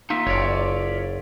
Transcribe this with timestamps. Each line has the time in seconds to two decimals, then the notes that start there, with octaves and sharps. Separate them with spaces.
0.10 A#3 D#4 F4 E5
0.27 F#1 C#5 D5